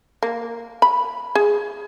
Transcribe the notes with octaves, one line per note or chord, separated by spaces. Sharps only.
A#3
B5
G#4